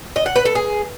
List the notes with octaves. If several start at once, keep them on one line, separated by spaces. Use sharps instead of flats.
D#5
F#5
B4
A4
G#4